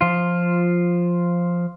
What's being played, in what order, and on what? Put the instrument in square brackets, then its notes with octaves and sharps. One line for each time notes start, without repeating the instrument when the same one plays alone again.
[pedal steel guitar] F3 F4